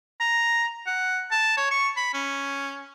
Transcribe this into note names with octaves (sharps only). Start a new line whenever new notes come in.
A#5
F#5
A5
C#5
C#6
B5
C#4